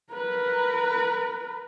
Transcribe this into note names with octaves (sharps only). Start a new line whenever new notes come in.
A#4 B4